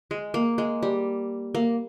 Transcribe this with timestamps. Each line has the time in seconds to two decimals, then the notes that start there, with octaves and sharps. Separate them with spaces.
0.11 G#3
0.34 A#3
0.58 G#3
0.83 G3
1.55 A#3